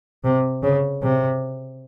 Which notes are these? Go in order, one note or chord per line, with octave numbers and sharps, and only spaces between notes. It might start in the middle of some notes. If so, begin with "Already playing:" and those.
C3
C#3
C3